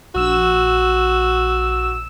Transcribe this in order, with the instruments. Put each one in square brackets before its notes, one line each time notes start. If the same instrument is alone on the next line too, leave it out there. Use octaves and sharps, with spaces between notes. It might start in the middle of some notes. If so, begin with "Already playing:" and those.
[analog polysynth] A#1 E6 E7 [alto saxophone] F#4